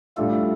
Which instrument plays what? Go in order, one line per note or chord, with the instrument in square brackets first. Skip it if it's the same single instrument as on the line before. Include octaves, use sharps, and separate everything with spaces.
[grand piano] A2 G3 D4 F4 [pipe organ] A3 A4